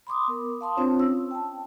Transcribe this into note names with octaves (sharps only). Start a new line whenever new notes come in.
B5 C6 D6 D#6
B3 A#4
F5 A5 C6 D#6
C4 D4 F4 C5 C#5
C#4 E6
G5 A5